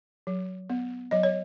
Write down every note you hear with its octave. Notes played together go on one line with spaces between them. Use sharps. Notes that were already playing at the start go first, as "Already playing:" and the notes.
F#3
B3
F#3 D#5
C#5